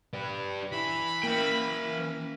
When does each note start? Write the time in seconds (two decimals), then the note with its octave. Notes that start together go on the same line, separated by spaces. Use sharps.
0.13 D4 G4 B4
0.72 E3 B5
1.23 A#3 C#4 E5 G5